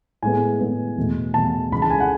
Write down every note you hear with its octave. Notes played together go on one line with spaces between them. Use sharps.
A2 G#3 B3 G#5
A2 G#3 B3
E2 B2 A3
E2 B2 A3 A5
C#2 C#3 E3 G#3 B5
A5
G#5
F#5